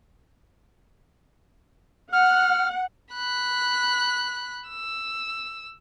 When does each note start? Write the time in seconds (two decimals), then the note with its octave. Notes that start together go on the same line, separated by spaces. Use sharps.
2.13 F#5 F6
3.14 B5 F#6
4.69 E6